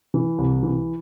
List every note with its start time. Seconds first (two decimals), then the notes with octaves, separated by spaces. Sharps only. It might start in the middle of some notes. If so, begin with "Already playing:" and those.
0.14 E3
0.38 C2
0.63 E3